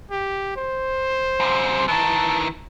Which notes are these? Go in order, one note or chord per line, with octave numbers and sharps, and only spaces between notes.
G4
C5
F#2 C3
D#3 E3 A5